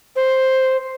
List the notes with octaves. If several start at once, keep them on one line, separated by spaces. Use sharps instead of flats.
C5